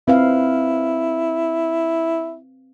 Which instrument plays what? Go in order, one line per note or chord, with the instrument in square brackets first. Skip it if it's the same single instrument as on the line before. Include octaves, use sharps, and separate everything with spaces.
[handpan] C4 B4 F5 [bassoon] E4